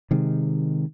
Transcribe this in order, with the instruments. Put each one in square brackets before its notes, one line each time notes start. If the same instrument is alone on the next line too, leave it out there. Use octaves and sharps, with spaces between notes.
[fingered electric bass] C3 D#3 G#3